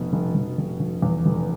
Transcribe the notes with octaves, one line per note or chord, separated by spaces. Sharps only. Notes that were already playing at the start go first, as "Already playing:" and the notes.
Already playing: F1 B2
F1
F1
F1
F1
E2
F1